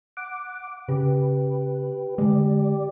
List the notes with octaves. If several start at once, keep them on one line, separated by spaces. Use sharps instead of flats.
F#5 D6
C#3 G4 B4
D3 G#3 G4 D5